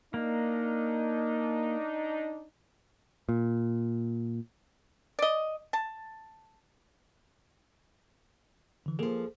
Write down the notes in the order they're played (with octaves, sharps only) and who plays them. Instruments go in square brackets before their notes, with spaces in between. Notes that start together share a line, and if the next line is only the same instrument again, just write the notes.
[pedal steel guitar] A#3 [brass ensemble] D4 D#4
[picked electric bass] A#2
[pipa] D5 D#5
A5
[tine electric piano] D3 E3
[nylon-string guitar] F3 A#3 [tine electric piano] G#4 A4